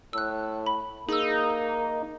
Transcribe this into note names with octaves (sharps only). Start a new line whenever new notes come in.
A2 E6 F#6
B5
A#3 D#4 G#4 E6